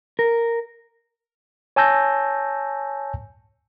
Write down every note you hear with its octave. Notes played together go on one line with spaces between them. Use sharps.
A#4
C#5 G#5 A5 E6 G6 A#6